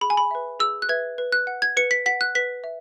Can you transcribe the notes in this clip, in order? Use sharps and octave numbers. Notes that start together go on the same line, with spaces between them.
G#4 B5
G#5
B5
B4 E5
G#4 E6
F#6
B4 E5 G#6
B4
F#6
F#5
G#6
B4 C#7
B6
F#5 B6
F#6
B4 B6
E5